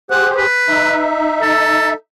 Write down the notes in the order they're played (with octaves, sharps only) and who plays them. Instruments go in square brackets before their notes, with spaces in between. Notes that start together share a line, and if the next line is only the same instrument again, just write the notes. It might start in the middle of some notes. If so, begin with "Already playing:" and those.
[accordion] G4 G#4 C5 [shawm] F#5
[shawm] B4
[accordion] D#4 E5
[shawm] A4